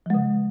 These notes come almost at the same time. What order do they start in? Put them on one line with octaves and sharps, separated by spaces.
F3 G#3 C#3